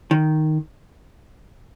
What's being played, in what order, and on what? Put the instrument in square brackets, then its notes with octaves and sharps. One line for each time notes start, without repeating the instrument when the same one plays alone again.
[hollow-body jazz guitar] D#3